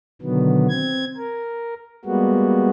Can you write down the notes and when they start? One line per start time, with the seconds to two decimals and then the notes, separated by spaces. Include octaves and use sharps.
0.22 B2 D3 D#3 F#3 B3
0.69 C4 G#6
1.18 A#4
2.05 G3 G#3 A#3 B3 F#4